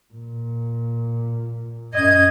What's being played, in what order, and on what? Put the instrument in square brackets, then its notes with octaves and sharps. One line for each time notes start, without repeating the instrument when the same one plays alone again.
[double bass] A#2
[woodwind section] F#2 [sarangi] D#5 [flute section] G#6